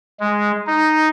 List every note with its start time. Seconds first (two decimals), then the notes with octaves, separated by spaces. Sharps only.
0.20 G#3
0.66 D#4